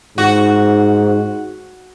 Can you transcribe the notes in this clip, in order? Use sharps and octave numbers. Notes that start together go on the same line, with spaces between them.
G#2 F#4